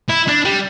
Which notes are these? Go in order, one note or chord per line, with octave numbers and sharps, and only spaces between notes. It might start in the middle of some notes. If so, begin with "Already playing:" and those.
E4
D4
G3